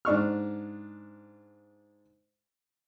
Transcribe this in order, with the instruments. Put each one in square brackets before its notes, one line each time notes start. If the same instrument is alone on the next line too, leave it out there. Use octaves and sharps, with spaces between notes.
[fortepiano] G#2 D4 C#6 F6